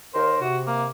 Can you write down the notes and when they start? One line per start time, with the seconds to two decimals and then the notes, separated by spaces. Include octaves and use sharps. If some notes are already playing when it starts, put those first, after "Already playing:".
0.14 D#2 A#4 C5
0.41 C3 F#4
0.67 A#3